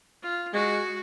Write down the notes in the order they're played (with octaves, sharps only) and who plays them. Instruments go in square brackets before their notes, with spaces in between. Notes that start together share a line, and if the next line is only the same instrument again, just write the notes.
[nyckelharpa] F4
[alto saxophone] G#3 [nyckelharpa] F#4